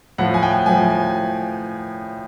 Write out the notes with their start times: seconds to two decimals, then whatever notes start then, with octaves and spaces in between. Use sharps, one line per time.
0.18 A2 F3 F#5
0.34 G#5
0.43 G5
0.66 A2 F3 G#5
0.90 G#5